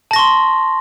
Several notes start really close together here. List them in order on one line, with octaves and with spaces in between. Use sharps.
A5 A#6 C#6 C6